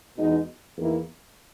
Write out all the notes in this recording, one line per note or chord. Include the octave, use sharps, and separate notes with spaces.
E2 B2 G#3 D#4
E2 D#3 A#3 E4